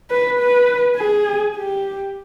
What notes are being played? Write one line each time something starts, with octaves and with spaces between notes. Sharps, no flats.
B4
B4
G#4
G4